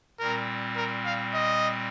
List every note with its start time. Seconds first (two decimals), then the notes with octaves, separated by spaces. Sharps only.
0.19 A#2 G3 C4 A#4
0.76 A#4
1.05 F5
1.34 D#5